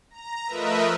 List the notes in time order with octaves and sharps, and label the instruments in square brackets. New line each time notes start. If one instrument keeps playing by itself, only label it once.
[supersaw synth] A#5
F3 A3 A#4 B4 D#5 E5